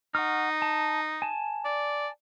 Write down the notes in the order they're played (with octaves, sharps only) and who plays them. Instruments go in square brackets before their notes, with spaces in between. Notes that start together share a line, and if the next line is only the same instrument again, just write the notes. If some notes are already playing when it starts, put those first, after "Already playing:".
[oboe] D#4 [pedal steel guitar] F#5 C#6 F6
[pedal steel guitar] A5
G#5 A5
[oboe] D5